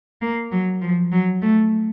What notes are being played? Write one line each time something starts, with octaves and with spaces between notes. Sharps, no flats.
A#3
F#3
F3
F#3
A3